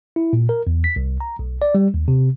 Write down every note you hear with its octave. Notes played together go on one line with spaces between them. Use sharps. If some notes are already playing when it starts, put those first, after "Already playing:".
E4
A#2
A#4
E2
B6
C2
A#5
B1
D5
G3
D#2
C3